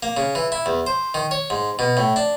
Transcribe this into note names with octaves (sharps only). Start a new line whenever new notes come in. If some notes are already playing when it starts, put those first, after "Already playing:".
A#3
C#3
E3
E4
E2
C5
D#3
C#5
G#2
B2
A2
D4